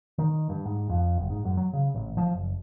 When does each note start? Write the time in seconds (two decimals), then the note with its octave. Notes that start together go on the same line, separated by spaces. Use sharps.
0.18 D#3
0.49 G2
0.66 G#2
0.89 F2
1.18 F#1
1.30 G#2
1.45 F#2
1.57 F#3
1.73 C#3
1.95 A1
2.17 F3
2.34 F#1